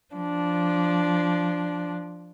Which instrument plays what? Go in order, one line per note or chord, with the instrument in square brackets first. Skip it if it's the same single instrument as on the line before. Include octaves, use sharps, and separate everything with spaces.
[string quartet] F3 D4